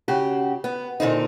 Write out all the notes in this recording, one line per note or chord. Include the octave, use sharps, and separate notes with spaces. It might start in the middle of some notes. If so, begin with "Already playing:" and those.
C#3 F#4 G4
B3
A#2 D3 C4 D#4